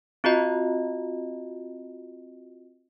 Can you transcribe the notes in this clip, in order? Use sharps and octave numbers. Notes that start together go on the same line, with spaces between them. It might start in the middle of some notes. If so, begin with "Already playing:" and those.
C4 F4 F#4 D#5